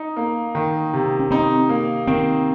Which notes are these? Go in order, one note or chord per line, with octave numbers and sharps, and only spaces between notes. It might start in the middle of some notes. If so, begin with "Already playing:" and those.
Already playing: D#4
A#3
D#3
C3
C#4
C4 D#4
A#3
D#3 C4